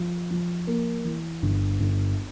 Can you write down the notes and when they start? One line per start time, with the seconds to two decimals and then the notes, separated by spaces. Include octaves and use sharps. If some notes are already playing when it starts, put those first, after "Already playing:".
Already playing: F3
0.31 F3
0.67 A#3
1.04 E3
1.42 G1
1.80 G1